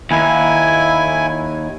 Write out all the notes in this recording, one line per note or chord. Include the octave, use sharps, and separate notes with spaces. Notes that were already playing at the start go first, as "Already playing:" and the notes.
D#2 E4 G#5